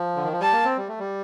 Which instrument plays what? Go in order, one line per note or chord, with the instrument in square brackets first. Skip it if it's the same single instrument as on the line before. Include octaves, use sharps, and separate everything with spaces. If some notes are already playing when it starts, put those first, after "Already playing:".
Already playing: [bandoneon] F3
D3
D#3
F3
[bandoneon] G3 [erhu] A5
[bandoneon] A#3
C4
G3
A3
G3